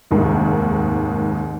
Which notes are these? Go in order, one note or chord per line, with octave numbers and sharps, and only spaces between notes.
F1 D#2 G#2 D#3